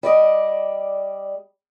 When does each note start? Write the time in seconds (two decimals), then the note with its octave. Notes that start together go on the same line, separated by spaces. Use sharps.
0.03 G3 D5 D#5